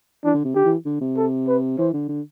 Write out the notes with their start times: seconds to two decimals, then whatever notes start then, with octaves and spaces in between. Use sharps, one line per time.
0.24 E3 D4
0.34 D3
0.45 C3
0.55 D3 G4
0.65 E3
0.86 D3
1.01 C3
1.17 A4
1.48 B4
1.78 E3 C5
1.93 D3
2.09 D3